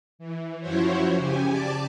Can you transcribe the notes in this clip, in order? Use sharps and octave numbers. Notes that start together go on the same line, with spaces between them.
E3
F#2 F3 E4 F#4 C5 C#5
C#3 G4 G#5
D5 A5 D6